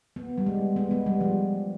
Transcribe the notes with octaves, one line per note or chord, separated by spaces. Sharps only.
B3
G3
G#3
B3
G#3
G3
F3